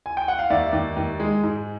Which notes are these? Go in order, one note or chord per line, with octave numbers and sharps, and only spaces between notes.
G#5
G5
F#5
F5
D#2 D5 E5
D#2
D#2
G#3
G#2